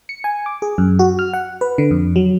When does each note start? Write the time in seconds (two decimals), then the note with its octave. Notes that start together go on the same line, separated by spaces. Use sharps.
0.09 C#7
0.24 G#5
0.46 D6
0.62 G#4
0.78 F#2
0.99 F#4
1.19 F6
1.33 F#5
1.61 B4
1.78 D3
1.91 F2
2.16 F#3